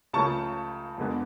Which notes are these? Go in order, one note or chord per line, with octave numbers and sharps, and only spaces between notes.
C#2 C#3 F3 A3 A5 C#6
F2 D3 G#3 B3